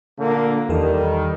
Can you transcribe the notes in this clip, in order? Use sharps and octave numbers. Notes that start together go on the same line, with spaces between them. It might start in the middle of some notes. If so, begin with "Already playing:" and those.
A#2 D3 A#3
E2 D#3 E3 G3 A4